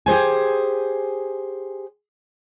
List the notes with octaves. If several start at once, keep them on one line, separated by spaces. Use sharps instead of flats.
G4 G#4 C5 G#5